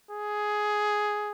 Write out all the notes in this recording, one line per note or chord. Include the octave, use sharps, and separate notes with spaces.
G#4